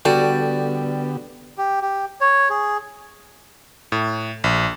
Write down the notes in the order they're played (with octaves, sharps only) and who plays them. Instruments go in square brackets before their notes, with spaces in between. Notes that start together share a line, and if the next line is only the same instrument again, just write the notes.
[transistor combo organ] D3 B3 G4 [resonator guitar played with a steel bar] G3 [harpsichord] F#4 [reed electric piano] A4 D5
[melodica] G4
G4
C#5
G#4
[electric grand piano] A2
A#1